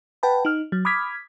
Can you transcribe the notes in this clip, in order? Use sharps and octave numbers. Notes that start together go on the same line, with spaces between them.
B4 F#5 G5 A5 B5
D#4 F6
F#3
B5 D6 D#6 F6 G#6 B6